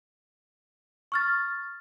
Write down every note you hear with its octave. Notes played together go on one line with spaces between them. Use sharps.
C#6 F6 A6